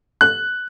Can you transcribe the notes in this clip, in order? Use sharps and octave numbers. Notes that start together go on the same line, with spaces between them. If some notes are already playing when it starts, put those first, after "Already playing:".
F#6